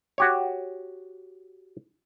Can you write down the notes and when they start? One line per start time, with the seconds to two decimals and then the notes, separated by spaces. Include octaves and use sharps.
0.18 F#4 G4 C#5